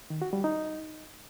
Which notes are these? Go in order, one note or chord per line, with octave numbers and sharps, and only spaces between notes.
D#3
F#4
G3
D#4